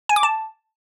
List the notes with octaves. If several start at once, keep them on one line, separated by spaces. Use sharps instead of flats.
G#5
D6
A5